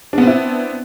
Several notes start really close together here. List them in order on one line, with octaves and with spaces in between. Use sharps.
D4 B3 C4 E4